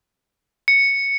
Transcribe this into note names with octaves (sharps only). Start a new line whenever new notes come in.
C#7